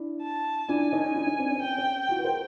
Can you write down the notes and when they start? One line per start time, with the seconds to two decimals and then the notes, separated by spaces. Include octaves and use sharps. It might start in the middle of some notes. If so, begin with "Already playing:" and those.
Already playing: D4 E4
0.22 A5
0.68 D4 E4 G#5
0.92 C#4 D#4
1.15 D4 E4
1.27 C#4 D#4
1.38 C4 D4
1.51 C#4
1.62 C4 G5
1.78 C#4
2.09 E4 F#4
2.18 B4
2.24 A#4 C5